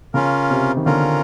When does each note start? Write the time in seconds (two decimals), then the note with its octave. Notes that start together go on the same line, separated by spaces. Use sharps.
0.14 C#3 C#4 F4 A#4
0.50 C3
0.77 D#3
0.86 D3 C#4 F4 A#4